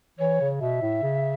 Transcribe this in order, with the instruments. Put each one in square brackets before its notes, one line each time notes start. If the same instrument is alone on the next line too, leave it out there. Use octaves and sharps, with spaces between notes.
[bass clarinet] E3 [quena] C#5
[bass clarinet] C#3
[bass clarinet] B2 [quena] E5
[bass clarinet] A2
C#3